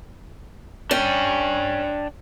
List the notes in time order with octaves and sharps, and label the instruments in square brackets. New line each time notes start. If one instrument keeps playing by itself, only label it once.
[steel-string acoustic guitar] C#4 [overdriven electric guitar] D4 G5